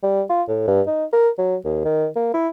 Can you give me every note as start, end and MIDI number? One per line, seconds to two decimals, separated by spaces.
0.03 0.23 55
0.30 0.43 65
0.48 0.64 45
0.68 0.82 43
0.87 1.05 63
1.13 1.29 70
1.38 1.56 54
1.65 1.84 39
1.85 2.07 51
2.16 2.32 58
2.34 2.48 64